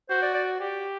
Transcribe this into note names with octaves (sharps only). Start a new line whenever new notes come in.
F#4 C5
D5
D5
G4